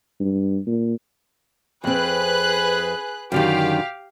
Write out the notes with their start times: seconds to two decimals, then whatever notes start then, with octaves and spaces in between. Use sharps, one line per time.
0.20 G2
0.67 A#2
1.84 F2 C4 G#4 B4 F#6
3.32 F#2 D3 D#3 G4 F5